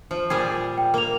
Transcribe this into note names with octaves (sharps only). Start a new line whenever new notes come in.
F3
A#2 G3 G#4
G5
A#3 A#4 F7